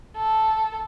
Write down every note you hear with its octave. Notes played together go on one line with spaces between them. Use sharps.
A4